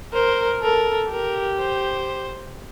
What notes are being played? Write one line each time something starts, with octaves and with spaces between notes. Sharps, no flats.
A#4 C5
A4 A#4
G4 A#4
C5